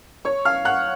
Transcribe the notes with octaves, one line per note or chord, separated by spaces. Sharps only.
C#5 C#6
F5 F6
F#5 F#6